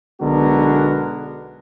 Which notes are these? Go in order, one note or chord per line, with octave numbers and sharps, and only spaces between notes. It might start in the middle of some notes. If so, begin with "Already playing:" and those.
B1 D3 G#3 B3 F#4 A#4